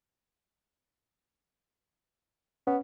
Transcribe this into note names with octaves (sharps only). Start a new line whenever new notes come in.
B3 C#4